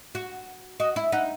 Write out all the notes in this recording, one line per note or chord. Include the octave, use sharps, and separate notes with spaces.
F#4
F#4 D#5
E4
D#4 F#5